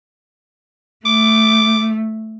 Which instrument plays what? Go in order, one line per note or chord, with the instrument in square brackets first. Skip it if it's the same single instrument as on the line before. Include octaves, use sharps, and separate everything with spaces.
[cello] A3 [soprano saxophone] D6